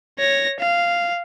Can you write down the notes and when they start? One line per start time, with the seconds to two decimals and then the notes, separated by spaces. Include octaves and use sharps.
0.19 C#5 A#6
0.59 F5